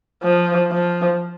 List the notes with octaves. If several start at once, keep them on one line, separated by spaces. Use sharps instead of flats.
F3
F3